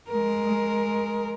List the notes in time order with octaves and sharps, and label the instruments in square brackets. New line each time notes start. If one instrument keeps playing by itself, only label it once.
[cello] G#3 A#4